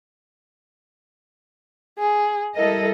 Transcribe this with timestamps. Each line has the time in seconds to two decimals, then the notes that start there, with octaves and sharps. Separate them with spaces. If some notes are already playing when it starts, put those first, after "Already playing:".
1.99 G#4
2.56 G3 E4 A4 A#4 D#5